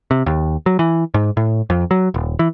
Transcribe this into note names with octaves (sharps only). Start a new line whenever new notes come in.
C3
D#2
F#3
E3
G#2
A2
F2
F#3
D#1
E3